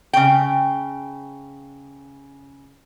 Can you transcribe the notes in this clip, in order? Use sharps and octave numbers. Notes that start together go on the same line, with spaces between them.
C#3 G5